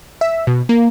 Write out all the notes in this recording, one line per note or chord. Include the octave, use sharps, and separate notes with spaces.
E5
B2
A#3